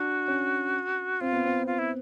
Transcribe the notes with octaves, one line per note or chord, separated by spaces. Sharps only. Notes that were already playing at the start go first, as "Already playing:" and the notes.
Already playing: D4 F#4
C#4
C4 F4
B3
C4
F4
E4